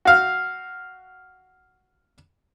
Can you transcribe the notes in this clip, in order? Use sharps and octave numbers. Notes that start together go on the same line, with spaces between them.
F#4 F5